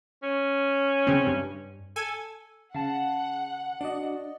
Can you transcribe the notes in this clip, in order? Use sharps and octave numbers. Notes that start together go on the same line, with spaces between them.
C#4
C#3 C4
G2
A4 G#5
C#3 F5 F#5 A5
D4 F#4 D5 D#5